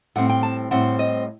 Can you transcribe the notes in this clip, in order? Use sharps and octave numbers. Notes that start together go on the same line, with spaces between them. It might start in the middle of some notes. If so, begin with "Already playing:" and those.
A2 G3 C4 F#5
G5
A5
A2 G3 C4 F#5
D#5